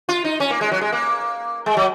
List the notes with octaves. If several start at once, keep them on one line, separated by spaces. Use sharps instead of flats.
F4
D#4
C#4
A#3
G#3
F#3
G#3
A#3
G#3
F#3